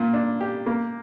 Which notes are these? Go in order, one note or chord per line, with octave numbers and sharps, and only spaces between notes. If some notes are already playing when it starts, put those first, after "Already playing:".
Already playing: A#2
D4
G4
A#3